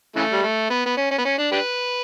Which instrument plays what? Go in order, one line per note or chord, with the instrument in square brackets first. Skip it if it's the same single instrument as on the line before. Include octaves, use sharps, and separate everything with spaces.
[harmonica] C#3 E3 A3
G3
A3
B3
B3
C#4
C#4
B3
C#4
D4
D4 G4 B4